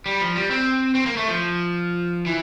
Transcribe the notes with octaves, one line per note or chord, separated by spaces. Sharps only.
G3
F3
G3
C4
C4
A#3
A3
F3
E3